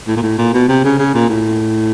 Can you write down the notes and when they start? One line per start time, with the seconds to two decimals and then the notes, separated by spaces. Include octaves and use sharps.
0.07 A2
0.16 A#2
0.22 A2
0.38 A#2
0.53 B2
0.68 C3
0.84 C#3
0.99 C#3
1.14 A#2
1.29 A2